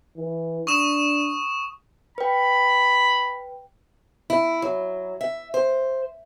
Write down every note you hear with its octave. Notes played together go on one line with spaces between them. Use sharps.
E3
D4 C#6 D#6 E7
B4 G5 B5
E4
F#3
E5
C5